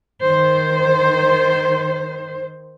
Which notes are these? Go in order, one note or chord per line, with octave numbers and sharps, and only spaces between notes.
D#3 C5